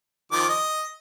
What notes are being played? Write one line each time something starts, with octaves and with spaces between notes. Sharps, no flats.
D#3 F3 D6
D#5